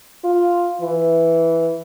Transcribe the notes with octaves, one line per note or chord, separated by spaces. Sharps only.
F4
E3